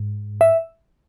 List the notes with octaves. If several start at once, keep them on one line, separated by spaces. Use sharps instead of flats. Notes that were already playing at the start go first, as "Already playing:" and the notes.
Already playing: G#2
E5